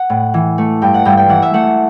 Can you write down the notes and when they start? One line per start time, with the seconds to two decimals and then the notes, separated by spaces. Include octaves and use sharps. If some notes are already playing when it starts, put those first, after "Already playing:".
Already playing: F#5
0.10 A2
0.34 E3
0.58 A3
0.82 G2 G5
0.94 F#5
1.05 G2 G5
1.17 G5
1.29 E3 F#5
1.42 E5
1.54 A3 F#5